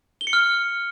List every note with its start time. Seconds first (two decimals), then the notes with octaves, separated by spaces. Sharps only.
0.21 G7
0.27 C#7
0.33 F6